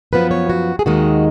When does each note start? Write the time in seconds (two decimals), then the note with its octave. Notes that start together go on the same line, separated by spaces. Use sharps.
0.13 F#2 F3 B3 B4
0.31 C#5
0.50 F#4
0.79 G#4
0.86 D#2 D#3 G#3 D#4 F#4